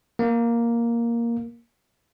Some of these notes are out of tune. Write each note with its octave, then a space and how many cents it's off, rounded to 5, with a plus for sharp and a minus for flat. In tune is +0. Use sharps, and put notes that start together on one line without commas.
A#3 +5